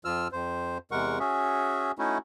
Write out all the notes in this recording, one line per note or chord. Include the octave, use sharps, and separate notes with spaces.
F2 F3 F4 E6 F6
F2 C5
E2 C3 G#3 A#4 F#5 C#6
C#4 F#4 G#4 E5
A3 C#4 D#4 E4 F#4